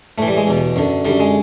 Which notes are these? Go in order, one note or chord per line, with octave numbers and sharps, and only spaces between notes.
A2 E3 A3
G3
G#3
E2 B2
F#2 D3
F#2 D3 G3
G#3